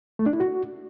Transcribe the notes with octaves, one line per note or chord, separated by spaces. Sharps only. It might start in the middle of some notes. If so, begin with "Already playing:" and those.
A3
D4
E4
F#4